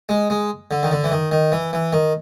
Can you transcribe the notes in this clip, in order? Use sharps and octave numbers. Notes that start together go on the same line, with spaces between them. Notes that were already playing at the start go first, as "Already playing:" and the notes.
G#3
G#3
D3
D#3
D3
E3
D#3
D#3
E3
E3
D#3